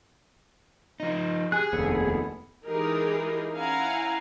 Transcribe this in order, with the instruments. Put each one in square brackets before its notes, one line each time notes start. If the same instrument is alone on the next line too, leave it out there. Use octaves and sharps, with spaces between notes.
[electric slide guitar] F3 D#4
[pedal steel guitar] G4 G#5 F#6 [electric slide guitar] G#4
[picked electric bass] F1 D#2 [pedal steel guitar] B3 A4
[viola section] E3 G#3 D#4 G4 G#4 A#4
C#4 E4 F5 F#5 G#5 A#5